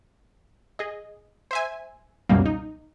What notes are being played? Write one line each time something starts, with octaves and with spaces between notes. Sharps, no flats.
G#4 D#5
C5 E5 G#5
C#2 F#2 B2 G3 A#3
D#4